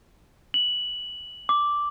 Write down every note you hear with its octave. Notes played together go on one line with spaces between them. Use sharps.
F#7
D6